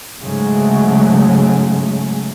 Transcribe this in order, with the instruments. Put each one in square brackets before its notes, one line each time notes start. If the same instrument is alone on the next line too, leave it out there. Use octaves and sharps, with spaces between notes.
[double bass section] G#2 C#3 F#3 G#3 A3